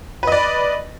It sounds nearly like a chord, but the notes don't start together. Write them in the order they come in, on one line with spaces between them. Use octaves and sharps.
B4 D#5 D5